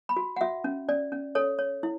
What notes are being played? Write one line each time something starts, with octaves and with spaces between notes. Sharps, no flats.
B5
F#4
F#5
F#4 E5
C#4
C#4 D5
C#4
A4 C#5
C#5
E4